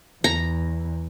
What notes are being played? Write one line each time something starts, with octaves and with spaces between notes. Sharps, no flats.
E2 A#5